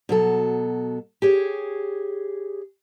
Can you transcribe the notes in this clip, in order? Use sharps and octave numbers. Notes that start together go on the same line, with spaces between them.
B2 F#3 A4
G4 G#4 C#5